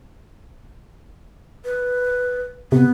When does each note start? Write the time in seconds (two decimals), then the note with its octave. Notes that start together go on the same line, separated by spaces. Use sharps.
1.65 B4
2.72 C3 B3